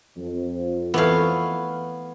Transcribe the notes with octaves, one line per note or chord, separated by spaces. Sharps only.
F2
E3 A3 B3 C#5 F5